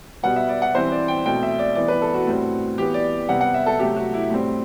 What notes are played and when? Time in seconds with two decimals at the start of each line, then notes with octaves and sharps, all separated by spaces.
0.23 B2 G3 B3 F#5
0.36 E5
0.49 D5
0.62 F#5
0.74 E3 G3 C4 C5
0.92 D5
1.08 G5
1.25 B2 A3 C4 G5
1.43 E5
1.59 D5
1.75 E3 G3 B3 D5
1.88 B4
2.02 A4
2.14 F#4
2.27 A2 G3 C4
2.78 E3 B3 G4
2.94 D5
3.29 C3 G3 B3 F#5
3.41 F#5
3.54 E5
3.66 A4
3.79 C3 F#3 A3 G4
3.96 F#4
4.14 E4
4.30 A2 G3 C4